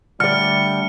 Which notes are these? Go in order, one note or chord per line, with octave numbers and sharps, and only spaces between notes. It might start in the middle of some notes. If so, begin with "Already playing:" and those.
D3 G3 A3 D5 F6 C#7